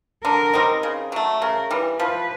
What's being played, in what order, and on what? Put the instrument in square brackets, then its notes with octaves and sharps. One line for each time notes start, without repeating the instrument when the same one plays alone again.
[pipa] D3 [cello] A#4
[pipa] G3 C4 D#4
C#3
F#3 A3
[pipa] C#3 [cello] A#4
[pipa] E3 G3
[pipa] F3 [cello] B4